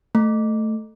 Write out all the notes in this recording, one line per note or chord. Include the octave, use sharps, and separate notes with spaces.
A3